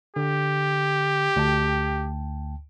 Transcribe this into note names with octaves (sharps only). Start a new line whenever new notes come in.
D3 G4
D2 G5 A5